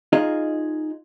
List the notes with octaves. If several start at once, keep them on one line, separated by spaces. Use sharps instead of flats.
D#4 F4 G#4 D#5